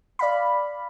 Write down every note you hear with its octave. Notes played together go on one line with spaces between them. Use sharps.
D5 F5 B5